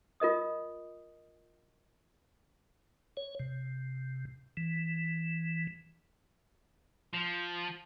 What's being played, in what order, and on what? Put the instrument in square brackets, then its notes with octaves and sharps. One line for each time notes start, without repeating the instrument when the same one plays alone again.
[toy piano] F4 A#4 D#5 D#6
[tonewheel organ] C#5
C3
E3
[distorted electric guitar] F3